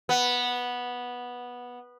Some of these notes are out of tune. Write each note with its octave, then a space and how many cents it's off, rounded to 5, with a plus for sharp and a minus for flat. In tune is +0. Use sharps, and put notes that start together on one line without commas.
B3 -10